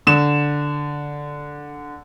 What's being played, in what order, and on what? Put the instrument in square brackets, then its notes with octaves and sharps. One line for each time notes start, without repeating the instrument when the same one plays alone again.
[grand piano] D3 E7